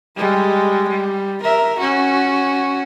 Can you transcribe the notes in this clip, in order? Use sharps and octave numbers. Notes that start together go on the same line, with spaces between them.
G3 G#3
G3
A#4 E5
C#4 F#4